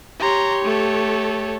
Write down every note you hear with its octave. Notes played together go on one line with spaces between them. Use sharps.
G4 C#5 A#5 C6
A3 A4